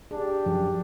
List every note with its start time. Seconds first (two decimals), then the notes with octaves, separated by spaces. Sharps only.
0.11 D4 G4 G#4
0.46 F#2 F3